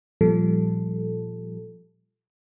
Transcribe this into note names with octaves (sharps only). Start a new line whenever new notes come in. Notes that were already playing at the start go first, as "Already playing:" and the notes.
A#2 F3 G3 A4